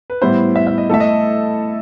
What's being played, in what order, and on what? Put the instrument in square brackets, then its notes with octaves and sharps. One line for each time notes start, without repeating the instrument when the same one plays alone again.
[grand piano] B4
[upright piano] A2 E3 G3 B3 E4 [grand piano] C5
[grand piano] E5
E5
D#5
[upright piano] E3 A3 E4 A4 [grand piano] E5
[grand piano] D#5